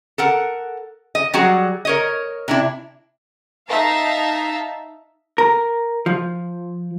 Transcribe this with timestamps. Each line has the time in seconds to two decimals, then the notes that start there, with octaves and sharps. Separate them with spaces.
0.18 A4 A#4 F#5
1.15 D#5
1.34 F#3 G3 F#4 G#4 F#5
1.85 A#4 C#5 D#5
2.48 C3 D4 E4
3.67 D#4 E5 F5 A5 A#5
5.38 A#4
6.06 F3